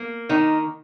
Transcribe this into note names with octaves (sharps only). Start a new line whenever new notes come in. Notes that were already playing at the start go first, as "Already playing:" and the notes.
Already playing: A#3
D#3 D#4